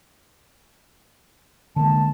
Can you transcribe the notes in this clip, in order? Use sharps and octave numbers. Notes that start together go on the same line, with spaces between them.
D3 G#3 A#3 A5